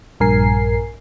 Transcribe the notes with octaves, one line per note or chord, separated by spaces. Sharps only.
A#1 G2 A#4 G#5 C7